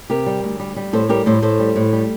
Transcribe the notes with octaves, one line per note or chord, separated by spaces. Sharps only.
C3 G4 A#4
G3
D2
G3
G3
A2 A4 C5
G3 G4 A#4
A2 A4 C5
A2 A4 C5
G3
A2
G3